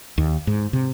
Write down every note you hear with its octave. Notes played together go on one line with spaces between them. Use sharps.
D#2
G#2
C3